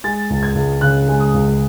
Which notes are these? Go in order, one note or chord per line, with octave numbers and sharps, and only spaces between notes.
G#3 A6
C#2
G#6
C#2
C#3 F#6
G#3
D#6
C#2